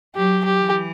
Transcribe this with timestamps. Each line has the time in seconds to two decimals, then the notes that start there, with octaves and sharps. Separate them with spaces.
0.15 F#3 G4
0.45 G4
0.60 E3